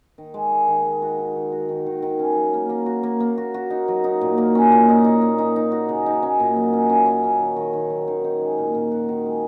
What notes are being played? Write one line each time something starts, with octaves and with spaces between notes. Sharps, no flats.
D#3
G#3
G#3
D#3
G#3
F#4
D#3
D#3
F#4
D#3
D#3
D#3
C#4
F#3
A#3
A#3
F#4
A#3
A#3
F#4
F#4
D#4
F#3
D#4
A#2
A#3
C#4
A#2
D#4
D#4
A#3
D#4
D#4
F#4
C#3
D#4
C#4
A#2
F#3
C#4
C#4
C#4
C#4
D#3
D#3
D#3
F#3
D#3
D#4
G#3
A#2
A#2
F#4
D#3
G#3